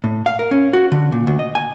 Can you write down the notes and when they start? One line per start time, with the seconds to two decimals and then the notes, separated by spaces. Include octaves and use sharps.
0.04 A2
0.26 F5
0.39 A#4
0.51 C#4
0.73 F#4
0.92 D3
1.12 A#2
1.27 D2
1.39 D#5
1.55 G#5